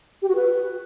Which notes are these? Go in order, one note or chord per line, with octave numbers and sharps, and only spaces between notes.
G4
F#4
B4